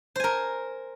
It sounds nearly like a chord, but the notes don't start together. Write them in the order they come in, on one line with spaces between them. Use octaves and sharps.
C5 G#5 A#4